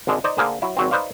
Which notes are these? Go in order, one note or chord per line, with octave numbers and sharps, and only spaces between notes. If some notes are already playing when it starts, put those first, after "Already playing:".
G#1 D3 G#3
D#4 C5 D5 D#5
D3 A#3 G#4 C5
F#3 E4
G#1 F#3 C4
D#4 B4 C5 D5 F5